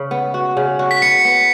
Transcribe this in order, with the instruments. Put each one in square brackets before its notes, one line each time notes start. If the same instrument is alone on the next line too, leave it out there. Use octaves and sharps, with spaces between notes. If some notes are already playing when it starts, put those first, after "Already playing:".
Already playing: [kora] C#3
B3
F#4
C#3
F#4
[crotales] B6
[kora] B3 [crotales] C#7
[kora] B3